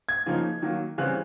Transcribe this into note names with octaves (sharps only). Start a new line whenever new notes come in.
G#6
C#3 F3 A#3 D#4
D#3 F#3 A#3
C#3 E3 G3 C4 F#6